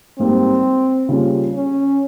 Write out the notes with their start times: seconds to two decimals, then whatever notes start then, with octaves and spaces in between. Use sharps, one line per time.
0.19 G#2 G3 A#3 C4
1.09 C#3 G3 A#3 F4
1.54 C#4